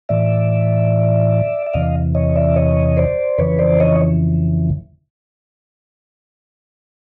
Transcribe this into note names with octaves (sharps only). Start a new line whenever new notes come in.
A2 E3 D5 E5
E5
E2 C3 E3 D#5 F5
C#5 D#5
D5 E5
C#5 D#5
C5 D5
F2 C#3 E3 B4 C#5
C5 D5
C#5 D#5